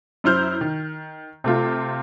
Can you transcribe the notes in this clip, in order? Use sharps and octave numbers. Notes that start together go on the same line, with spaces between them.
F#2 E4 C5 F6 G6
D#3
C3 A3 F4